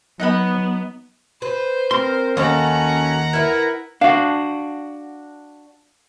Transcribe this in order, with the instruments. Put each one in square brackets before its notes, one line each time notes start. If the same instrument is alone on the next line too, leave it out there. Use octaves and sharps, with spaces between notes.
[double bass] F#3 [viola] B3 [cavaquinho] D#4 F#5 B5
[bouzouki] B4 [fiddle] C5
[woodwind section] C4 A#4 [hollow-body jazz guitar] C6
[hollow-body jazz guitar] D#2 [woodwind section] C#4 [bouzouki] F#4 A4 [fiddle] F#5 A#5
[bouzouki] E4 B4 [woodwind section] A#4
[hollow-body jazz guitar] D4 F#4 [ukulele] F5